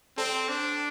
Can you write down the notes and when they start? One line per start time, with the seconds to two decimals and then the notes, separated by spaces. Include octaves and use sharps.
0.17 C4 A4 D5 A5 C6
0.48 D4